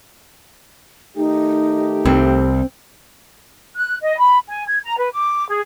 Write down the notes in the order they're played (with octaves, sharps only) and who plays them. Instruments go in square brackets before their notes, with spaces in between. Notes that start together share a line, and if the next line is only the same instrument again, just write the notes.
[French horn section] D#3 A3 G4 [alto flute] D#4
[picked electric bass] C2 [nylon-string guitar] C4
[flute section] F#6
D#5
B5
G#5
G#6
A#5
B4
D6
G#4